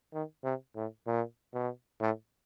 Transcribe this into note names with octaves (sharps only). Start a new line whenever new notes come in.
D#3
C3
A2
A#2
B2
A2